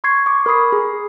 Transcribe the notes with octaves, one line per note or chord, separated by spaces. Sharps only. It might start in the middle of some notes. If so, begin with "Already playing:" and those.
C6 C#6 G#6 C7
C#6 D6
A#4 B5 D#6 C7
G#4